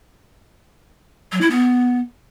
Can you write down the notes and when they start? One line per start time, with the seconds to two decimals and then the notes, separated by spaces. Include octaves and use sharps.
1.32 F#3
1.41 E4
1.50 B3